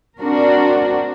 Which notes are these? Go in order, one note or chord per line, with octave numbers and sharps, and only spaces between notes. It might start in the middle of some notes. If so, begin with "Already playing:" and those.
C4 D4 F#4 A#4